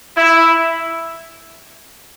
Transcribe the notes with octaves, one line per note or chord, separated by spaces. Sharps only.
E4